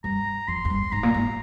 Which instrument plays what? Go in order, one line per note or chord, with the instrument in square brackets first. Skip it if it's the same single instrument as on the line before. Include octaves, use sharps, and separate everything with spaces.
[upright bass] G2 [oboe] A#5
[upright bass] F2 [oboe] C6
[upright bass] F2
G2
[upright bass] G#2 [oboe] A#5
[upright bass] A#2
G#2